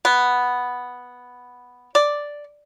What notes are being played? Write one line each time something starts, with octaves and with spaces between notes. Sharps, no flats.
B3
D5